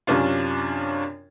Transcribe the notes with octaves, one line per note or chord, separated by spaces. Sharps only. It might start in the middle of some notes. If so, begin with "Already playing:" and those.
F#2 C3 C#4 D4 F4